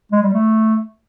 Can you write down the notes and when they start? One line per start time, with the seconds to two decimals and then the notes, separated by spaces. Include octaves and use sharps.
0.12 G#3
0.23 G3
0.33 A3